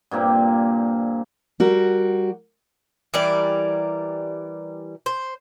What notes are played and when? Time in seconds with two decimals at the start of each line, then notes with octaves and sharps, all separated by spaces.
0.11 G2 A#2 A#3 C4
1.60 G3 F#4 A#4
3.14 E3 G3 A#4 D5
5.06 C5